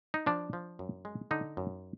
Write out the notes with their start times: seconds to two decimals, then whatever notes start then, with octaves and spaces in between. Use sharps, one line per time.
0.14 D#4
0.26 F3 D4
0.53 F3
0.79 F#2
1.05 G#3
1.31 D3 D#4
1.57 F#2